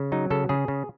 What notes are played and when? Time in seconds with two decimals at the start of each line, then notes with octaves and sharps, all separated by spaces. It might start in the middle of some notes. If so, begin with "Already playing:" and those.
Already playing: C#3
0.12 F#3 D#4
0.30 C#3 A4
0.49 C#3 G#4
0.68 C#3